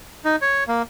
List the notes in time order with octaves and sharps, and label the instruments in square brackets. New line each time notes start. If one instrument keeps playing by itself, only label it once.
[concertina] D#4
C#5
A#3